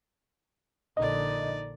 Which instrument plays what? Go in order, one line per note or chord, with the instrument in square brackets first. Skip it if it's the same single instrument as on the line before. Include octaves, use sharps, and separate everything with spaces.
[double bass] A#1 D3 [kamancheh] D#4 D5 [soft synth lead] D#5